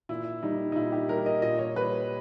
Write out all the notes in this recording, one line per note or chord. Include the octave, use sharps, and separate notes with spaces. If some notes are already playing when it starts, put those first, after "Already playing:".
A#2 E4
G3 D#4
D#4
A#2 E4
G4
G3 A#4
D#5
A#2 D#5
C#5
G3 B4